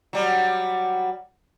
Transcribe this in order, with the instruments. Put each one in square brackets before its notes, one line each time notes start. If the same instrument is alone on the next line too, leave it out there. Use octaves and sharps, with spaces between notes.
[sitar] F#3 G3